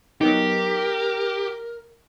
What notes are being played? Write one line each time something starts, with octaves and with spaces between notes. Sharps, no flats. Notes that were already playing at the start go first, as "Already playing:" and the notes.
F#3 B3 D#4 G4 A#4